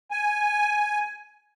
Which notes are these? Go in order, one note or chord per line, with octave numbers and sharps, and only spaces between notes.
G#5